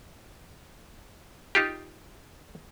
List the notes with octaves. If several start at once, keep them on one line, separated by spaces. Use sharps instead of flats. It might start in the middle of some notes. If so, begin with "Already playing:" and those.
D#4 F4 G4